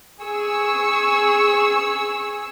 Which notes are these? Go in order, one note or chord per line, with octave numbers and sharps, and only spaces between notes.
G#4 C#6 E6